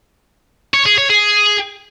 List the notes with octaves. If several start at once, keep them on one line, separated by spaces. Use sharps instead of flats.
C#5
G#4
C#5
G#4